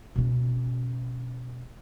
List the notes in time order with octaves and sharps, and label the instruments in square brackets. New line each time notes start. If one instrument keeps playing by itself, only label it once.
[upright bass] B2 C#4